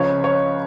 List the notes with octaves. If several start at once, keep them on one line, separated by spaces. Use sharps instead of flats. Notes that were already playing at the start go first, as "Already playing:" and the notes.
Already playing: C#2 C#3 F3 C#5
C#5